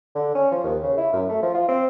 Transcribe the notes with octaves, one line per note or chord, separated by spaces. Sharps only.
D3
C#4
F3
D#2
C#3
E4
F#2
A3
F3
F4
C4